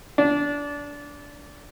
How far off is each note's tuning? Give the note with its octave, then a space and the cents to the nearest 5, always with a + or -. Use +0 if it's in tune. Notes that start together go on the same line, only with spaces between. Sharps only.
D4 -20